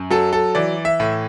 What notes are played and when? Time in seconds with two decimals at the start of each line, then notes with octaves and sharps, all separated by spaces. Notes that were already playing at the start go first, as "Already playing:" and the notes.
Already playing: F#2
0.10 F#3 A4
0.33 A4
0.55 E3 D5
0.85 E5
1.00 A2